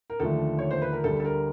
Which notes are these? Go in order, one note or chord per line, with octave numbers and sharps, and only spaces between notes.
A#4
D#2 D3 F3 A3 A4
C#5
C5
B4
A#4
D2 D3 G3 A4
A4
A#4